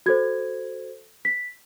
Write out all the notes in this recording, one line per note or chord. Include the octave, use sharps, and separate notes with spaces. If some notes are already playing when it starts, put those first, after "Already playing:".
F#4 A4 C5 G#6
B6